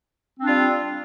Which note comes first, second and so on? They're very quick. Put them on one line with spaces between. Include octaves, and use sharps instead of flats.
C4 D4 F4 G3